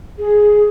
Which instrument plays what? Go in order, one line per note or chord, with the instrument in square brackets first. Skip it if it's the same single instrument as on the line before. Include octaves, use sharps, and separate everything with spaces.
[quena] G#4